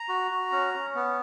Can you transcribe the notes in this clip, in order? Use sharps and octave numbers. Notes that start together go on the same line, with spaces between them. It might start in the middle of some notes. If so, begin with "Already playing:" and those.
Already playing: A#5
F#4
F#4
C#4
C#4
B3